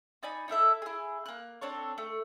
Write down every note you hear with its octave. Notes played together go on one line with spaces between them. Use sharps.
D#4 D5 G#5 B5
D#4 E4 A4 E5
E4 G#4
A#3 F#6
C4 D4 A4 C#5
A3